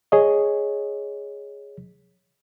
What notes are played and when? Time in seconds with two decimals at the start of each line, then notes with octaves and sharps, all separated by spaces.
0.12 G#4 C#5 D#5